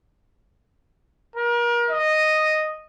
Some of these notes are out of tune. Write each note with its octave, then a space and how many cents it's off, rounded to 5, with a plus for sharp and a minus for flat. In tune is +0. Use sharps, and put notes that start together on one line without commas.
A#4 +35
D#5 -5